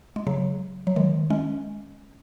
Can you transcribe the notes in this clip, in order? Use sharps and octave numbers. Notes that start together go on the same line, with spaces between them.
G#3
C#3 F#3
F#3
D#3 G#3
G#3 C#4